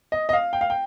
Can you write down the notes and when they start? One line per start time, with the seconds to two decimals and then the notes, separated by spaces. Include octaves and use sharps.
0.12 D#5
0.29 D#5
0.33 F5
0.53 G5
0.61 F5
0.70 G5